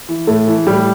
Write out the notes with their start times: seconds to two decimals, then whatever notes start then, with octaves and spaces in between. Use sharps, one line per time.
0.09 E3
0.27 A2 A3
0.47 E3
0.67 A2 G3